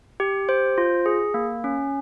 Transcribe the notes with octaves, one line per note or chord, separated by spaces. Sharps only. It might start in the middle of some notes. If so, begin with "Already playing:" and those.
G4
C5
F4
G#4
A#3
C#4